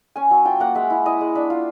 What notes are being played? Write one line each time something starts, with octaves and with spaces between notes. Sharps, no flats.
C#4 G#5
F#3
F4 G5
A#3 F#5
G#3 E5
E4
E4 D#5
G#3
D4 E5
F4